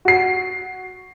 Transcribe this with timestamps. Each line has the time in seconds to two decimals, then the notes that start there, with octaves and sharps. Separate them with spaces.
0.05 F#4 C7